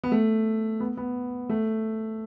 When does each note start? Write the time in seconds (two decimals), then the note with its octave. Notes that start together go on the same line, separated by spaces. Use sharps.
0.04 B3
0.12 A3
0.80 B3
0.97 B3
1.49 A3